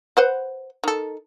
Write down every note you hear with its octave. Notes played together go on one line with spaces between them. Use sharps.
B4 C5 F#5
D#3 A4